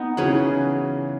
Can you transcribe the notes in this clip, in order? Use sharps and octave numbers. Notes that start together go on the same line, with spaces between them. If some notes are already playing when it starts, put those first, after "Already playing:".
Already playing: B3 D#4
C#3 E3 F#3 C#4 G#4 B4